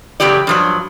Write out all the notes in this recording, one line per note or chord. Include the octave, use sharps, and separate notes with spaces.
E2 C#3 F#3 G4 D5
G2 F3 F#3